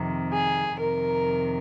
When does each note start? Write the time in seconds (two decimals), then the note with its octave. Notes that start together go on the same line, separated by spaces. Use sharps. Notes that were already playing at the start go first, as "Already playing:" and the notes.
Already playing: F2 C3 D#3
0.32 G#4
0.78 F2 C3 D#3 A#4